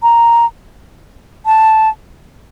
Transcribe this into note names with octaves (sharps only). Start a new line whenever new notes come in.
A#5
A5